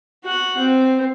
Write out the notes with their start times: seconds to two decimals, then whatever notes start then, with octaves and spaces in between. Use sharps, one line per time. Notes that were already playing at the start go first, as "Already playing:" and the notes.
0.24 F#4 F#5
0.58 C4